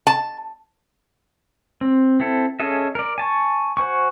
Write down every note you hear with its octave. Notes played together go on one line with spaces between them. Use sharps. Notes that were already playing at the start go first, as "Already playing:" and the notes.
A5
C4
C4 E4 A4
C#4 G#4 A4 D#5 E5
A#4 D5
G#5 A5 C#6
F#4 C5 G#5 C#6